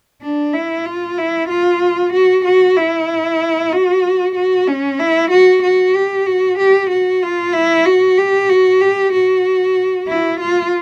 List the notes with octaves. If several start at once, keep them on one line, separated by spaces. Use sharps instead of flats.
D4
E4
F4
E4
F4
F#4
F#4
E4
F#4
F#4
C#4
E4
F#4
F#4
G4
F#4
G4
F#4
F4
E4
F#4
G4
F#4
G4
F#4
E4
F4